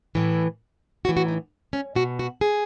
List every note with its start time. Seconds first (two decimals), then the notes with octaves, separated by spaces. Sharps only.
0.15 A2 E3 E4
1.05 A2 E3 F#4
1.17 F#4
1.28 D#4
1.73 C#4
1.95 B2 F#4
2.19 F#4
2.41 G#4